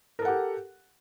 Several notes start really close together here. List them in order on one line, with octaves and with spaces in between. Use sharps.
A#4 A4 F#5 G4